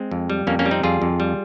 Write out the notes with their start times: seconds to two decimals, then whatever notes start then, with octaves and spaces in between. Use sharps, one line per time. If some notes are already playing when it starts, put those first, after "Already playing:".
Already playing: G#3 C4
0.11 F2
0.30 G3
0.47 F2 A#3 C#4
0.59 A#3 C#4
0.65 G3
0.71 C4 D#4
0.83 F2 F4 G#4
1.02 F2
1.20 G3